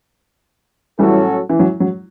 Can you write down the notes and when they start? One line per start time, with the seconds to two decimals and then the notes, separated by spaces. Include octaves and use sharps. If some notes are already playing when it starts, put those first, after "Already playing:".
0.99 A2 E3 F#3 G3 C#4 F#4 A4
1.50 E3
1.59 F#3
1.80 F#3